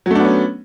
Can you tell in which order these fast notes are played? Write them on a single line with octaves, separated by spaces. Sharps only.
F#3 A3 D4 B3 C#4